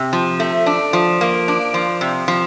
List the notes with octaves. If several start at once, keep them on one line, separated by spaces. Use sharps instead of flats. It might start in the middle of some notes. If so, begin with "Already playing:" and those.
Already playing: C3
F3
A3
D4
F3
A#3
D4
F3
C3
F3